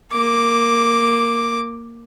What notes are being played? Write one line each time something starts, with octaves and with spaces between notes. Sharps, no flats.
A#3 D6